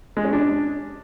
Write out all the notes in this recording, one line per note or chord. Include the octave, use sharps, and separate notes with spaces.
G#3
C#4
D4